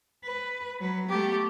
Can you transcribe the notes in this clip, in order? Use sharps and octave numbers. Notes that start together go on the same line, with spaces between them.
B4
F#3 B4
A3 B3 G4